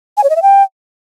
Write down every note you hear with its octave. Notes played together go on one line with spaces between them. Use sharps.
G#5
C#5
D#5
E5
G5